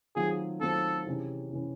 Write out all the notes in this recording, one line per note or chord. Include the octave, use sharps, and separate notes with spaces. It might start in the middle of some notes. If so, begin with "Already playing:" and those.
D#3 F#3 A3 C4 F4 G#4
D#3 F#3 A3 C4 F4 A4
C3 E3 G#3 C#4
C3 E3 G#3 C#4